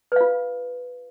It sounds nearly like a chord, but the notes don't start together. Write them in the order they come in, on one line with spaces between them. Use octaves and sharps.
B4 F5 F4